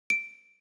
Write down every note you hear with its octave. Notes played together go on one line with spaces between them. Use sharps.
D7